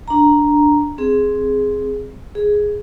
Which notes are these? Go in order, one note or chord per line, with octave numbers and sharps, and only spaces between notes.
D4 A#5
C4 G#4
G#4